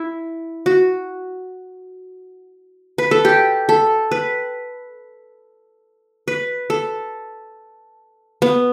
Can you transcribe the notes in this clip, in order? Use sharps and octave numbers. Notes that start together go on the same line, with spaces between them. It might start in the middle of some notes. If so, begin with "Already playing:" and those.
Already playing: E4
F#4
B4
A4
G4
A4
B4
B4
A4
B3